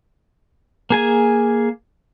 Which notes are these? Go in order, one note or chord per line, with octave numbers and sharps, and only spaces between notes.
A#3 G#4 G#5